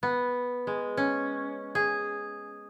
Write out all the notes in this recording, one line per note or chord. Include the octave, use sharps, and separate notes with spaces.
B3
G#3
C#4
G#4